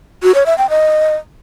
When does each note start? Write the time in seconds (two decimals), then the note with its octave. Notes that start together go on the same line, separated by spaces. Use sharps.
0.23 F#4
0.35 C#5
0.46 E5
0.58 G5
0.70 D#5